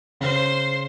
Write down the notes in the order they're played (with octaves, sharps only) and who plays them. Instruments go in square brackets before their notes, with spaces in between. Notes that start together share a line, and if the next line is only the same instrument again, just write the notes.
[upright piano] C#3 [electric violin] C5